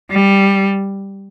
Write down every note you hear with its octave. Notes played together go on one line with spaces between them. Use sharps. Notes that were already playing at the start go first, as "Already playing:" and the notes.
G3